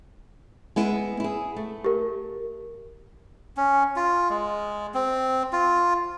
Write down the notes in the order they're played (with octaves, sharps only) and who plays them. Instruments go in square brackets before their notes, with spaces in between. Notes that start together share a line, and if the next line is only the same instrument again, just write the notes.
[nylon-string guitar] G#3 B3 E4
E4 G#4
A3
[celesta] G4 A#4
[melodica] C#4
F4
G#3
C4
F4